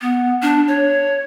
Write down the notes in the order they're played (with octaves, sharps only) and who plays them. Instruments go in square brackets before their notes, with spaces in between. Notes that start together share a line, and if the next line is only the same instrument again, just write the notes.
[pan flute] B3
D4
C#5